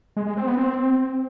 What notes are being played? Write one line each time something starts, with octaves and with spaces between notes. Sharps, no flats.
G#3
G#3
C4
B3
C4